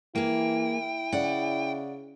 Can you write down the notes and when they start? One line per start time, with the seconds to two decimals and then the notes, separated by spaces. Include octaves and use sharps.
0.15 E3 A#3 E4 G#4 G5
1.12 C#3 D5 F#5